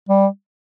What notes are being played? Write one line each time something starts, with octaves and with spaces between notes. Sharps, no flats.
G3